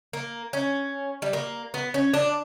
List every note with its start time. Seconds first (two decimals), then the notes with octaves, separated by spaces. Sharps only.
0.13 A#3
0.53 C#4
1.22 G3
1.33 A#3
1.74 B3
1.94 C#4
2.14 D4